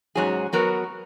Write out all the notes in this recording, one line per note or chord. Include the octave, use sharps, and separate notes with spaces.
G#2 F#3 C#4 G#4
F#3 B3 F#4 A#4